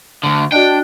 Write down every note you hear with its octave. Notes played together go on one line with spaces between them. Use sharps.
D2 D3
D4 F#4 D5 D#5 G5